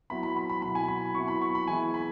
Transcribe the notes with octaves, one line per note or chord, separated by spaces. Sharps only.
F#3 B3 E4 B5
B5
B5
B5
B2 F#3 B3 E4 B5
G#5
B5
F#3 B3 E4 C#6
B5
C#6
B5
E3 G#3 B3 E4 G#5
B5